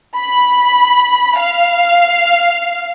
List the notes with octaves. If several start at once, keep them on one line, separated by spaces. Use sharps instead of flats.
B5
F5